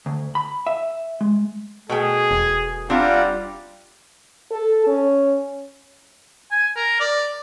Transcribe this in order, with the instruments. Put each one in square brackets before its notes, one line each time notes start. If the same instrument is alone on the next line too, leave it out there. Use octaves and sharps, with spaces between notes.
[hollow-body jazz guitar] D2
B5
E5
G#3
[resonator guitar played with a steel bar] B2 A3 G5 [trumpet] G#4
[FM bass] E1
[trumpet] G3 [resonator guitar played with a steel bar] C4 D4 G4 [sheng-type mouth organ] F4 F#5 A#5
[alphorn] A4
C#4
[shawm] G#5
A#4
D5